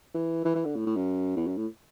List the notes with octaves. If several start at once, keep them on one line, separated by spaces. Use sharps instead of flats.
E3
E3
E3
D3
A2
A2
F#2
E2
F#2
A2